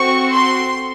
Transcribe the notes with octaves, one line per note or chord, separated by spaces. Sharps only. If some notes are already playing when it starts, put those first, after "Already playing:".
Already playing: C4 F#4 A4 C#6
C6